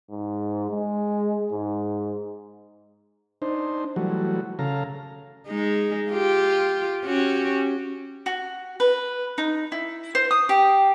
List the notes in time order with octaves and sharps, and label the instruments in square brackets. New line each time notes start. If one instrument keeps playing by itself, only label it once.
[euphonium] G#2
G#3
G#2
[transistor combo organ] D4 D#4 C5
E3 F#3 G3 A3 F#4
C#3 A4 F5 A#5
[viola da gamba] G#3 D#4
F4 G4
C#4 F#4 G4
[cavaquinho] F#4
B4
D#4
E4
C5
D#6
G4